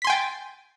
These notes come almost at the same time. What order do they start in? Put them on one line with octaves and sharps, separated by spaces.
B6 C6 G#5 G5 A6